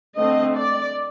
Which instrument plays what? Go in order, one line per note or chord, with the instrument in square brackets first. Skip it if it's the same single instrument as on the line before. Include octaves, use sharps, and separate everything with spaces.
[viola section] D3 A3 C4 D#5
D5